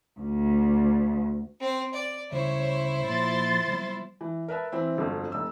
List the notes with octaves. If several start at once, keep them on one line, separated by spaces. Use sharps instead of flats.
D2
C4 C5
D5
D2 C#3 G3 E4 C5 C#5
A#2 F3 C6 A6
F#3 G3 B3
E3
A#4 B4 E5 A5
E3 C4 E5
G1 F2 F#3
F1 E6